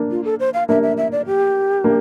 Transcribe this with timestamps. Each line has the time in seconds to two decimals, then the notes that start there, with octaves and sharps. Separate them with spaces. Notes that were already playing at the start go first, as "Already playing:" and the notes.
Already playing: A#3 D4
0.11 F4
0.25 A4
0.40 C5
0.54 F5
0.69 A#3 D4 E5
0.83 E5
0.97 E5
1.12 D5
1.26 G4
1.84 A#3 D4